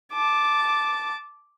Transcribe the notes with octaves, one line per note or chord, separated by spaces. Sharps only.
A5 D6